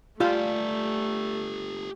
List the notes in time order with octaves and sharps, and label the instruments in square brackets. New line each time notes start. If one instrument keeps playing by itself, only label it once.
[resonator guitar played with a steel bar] G3 [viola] A3 [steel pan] F4 [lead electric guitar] G4 A4